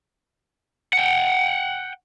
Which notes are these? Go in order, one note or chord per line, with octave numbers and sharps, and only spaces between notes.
F#5 G5